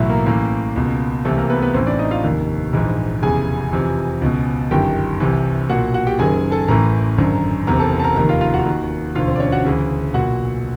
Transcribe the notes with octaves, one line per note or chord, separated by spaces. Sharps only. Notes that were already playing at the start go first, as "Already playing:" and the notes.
Already playing: B1 A2 E3 F#3 E4 F#4
A#3 A#4
A1 A2 E3 A#3 A#4
C#2 B2
C2 C3 E3 A3 A4
A#3 A#4
B3 B4
B3 B4
A1 A2 E3 C4 C5
D4 D5
D#4 D#5
F4 F5
F1 D#2 D#3
A#1 G#2 E3
F1 E2 C#3 E3 G#4 G#5
F1 F2 C3 E3
C#2 B2
G1 F#2 D#3 G4 G5
C2 C3 E3
B1 A#2 F#4 F#5
F#4 F#5
G4 G5
F#1 F#2 D#3 G#4 G#5
A4 A5
A1 A2 E3 A#4 A#5
G#1 F#2 D3
F#1 E2 C3 E3 A#4 A#5
A4 A5
A5
A#4 A#5
F1 D#2 D#3 A#4 A#5
F4 F5
F4 F5
F#4 F#5
D#2 D#3
E1 D2 D3 F4 F5
C4 C5
D5
C#4 C#5
F#4 F#5
D2 C#3 E3
B1 A#2 F#4 F#5